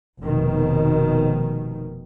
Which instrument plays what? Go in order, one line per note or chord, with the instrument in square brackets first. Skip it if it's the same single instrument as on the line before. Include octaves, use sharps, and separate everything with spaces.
[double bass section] F1 B2 D#3